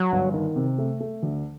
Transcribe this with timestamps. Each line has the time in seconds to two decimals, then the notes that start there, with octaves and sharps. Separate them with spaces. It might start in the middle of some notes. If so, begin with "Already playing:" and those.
Already playing: F#3
0.12 G1
0.34 D#3
0.56 C3
0.78 A3
1.00 A3
1.23 D2